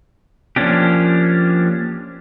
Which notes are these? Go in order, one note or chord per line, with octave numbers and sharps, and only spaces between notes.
F3 A#3 C#4 D4 G4